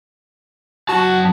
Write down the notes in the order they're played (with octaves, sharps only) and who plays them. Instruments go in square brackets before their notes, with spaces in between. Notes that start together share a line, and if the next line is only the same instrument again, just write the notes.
[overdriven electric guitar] F#2 A5 [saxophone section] F#4